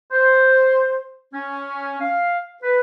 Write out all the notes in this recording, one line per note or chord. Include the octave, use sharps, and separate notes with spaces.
C5
C#4
F5
B4